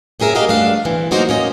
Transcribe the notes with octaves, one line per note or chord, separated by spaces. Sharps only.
G2 C#4 G#4 A#4 E5
G3 F#4 G4 A#4 D#5 F5
G2 A3 D4 F5
E3 C4
F#3 A#3 D#4 F#4 A#4 C5
A#3 C#4 D#5